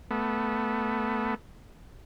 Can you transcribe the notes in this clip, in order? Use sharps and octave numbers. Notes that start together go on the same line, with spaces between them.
A3 B3